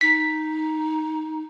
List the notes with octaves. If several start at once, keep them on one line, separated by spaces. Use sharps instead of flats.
D#4 B6